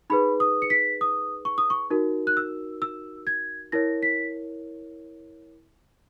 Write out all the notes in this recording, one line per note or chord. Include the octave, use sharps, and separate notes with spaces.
D#4 G#4 B4 B5
D#6
C#7
B6
D#6
C#6
D#6
C#6
D#4 F#4 A#4
F#6
E6
E6
G#6
E4 A#4 C#5 A#6
B6